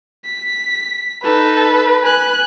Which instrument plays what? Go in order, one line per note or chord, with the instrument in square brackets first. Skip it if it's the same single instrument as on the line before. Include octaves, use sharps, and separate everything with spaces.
[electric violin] B6
[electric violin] D#4 A4 [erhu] B4
[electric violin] G#5 F#6